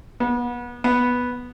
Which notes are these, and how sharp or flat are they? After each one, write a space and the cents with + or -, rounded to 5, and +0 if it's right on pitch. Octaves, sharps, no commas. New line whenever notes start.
B3 -30
B3 -5